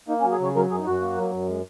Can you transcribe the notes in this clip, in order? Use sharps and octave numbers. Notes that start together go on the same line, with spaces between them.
A#3 D#4
C#4
F#3
G#4
C#3 C#5
F#3 A#4
F#2 G#4
D#4
F#2 F#4
A#3
F#3
F#2
G#3